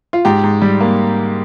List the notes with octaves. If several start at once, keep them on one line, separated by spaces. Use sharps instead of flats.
F4
G#2 G4
G#2
G3
A#3